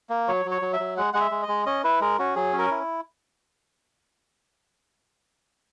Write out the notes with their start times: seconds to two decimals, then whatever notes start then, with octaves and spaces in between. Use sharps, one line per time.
0.10 A#3
0.28 F#3 C#5
0.45 F#3
0.51 C#5
0.62 F#3
0.73 E5
0.80 F#3
0.97 G#3 F#5
1.13 G#3 F#5
1.21 E5
1.31 G#3
1.43 D#5
1.48 G#3
1.66 C#4 D#5
1.84 E4 B4
2.00 G#3 A#4
2.19 C#4 F#4
2.35 F#3 G#4
2.53 C#4
2.59 A#4
2.71 E4